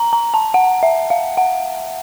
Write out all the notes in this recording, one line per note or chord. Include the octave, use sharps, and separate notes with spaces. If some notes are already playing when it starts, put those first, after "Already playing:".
Already playing: A#5
A#5
A5
F#5
E5
F5
F#5